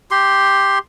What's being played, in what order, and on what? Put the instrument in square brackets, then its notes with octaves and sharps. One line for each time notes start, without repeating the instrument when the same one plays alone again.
[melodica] G4 C6